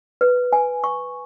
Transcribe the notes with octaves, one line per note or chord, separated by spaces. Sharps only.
B4
G#5
C#6